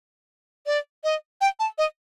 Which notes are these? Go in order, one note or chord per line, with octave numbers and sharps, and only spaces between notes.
D5
D#5
G5
A5
D#5